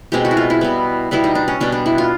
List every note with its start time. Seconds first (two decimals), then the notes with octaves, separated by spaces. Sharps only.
0.12 B2 G#3 C4 G4
0.25 F#4
0.31 E4
0.37 F4
0.50 E4
0.61 B2 G3 B3
1.11 B2 G3 B3 E4
1.24 D#4
1.35 D4
1.48 C#4
1.61 B2 G3 B3 D4
1.72 D4
1.86 E4
1.98 F4